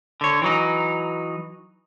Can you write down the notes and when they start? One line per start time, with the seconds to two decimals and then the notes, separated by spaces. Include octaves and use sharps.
0.21 D3 C#5
0.42 E3 F#3 D#4